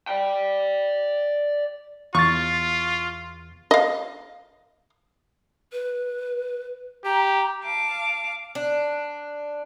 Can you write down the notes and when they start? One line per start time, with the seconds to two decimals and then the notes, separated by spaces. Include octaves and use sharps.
0.07 D5 G5
2.15 E2 F4 C#6 A6
3.71 D#5 F5
5.72 B4
7.05 G4 A#5
7.63 F5 A5 D6
8.55 D4